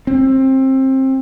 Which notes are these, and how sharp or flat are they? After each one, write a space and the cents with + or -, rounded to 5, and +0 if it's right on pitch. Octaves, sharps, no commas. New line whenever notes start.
C4 +25